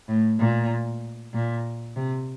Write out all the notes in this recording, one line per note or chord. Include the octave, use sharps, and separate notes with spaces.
A2
A#2
A#2
C3